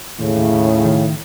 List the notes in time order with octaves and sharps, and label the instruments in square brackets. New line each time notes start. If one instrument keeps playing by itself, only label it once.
[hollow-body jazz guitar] D#2 [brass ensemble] A2 C#3
[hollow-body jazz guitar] D#2
D#2
D#3
D#3